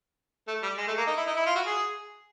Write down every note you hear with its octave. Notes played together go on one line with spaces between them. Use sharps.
A3
G3
G#3
A3
A#3
D#4
E4
D#4
E4
F4
F#4
G#4